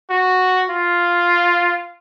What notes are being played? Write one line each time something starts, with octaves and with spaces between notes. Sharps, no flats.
F#4
F4